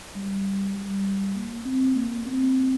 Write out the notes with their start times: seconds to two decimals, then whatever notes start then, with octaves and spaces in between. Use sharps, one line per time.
0.16 G3
0.76 G3
1.36 A#3
1.65 C4
1.96 A#3
2.26 C4